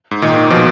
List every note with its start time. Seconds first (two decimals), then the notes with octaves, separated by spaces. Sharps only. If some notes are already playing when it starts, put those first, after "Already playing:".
0.11 G#2
0.22 A#2 D#3
0.50 B2 F3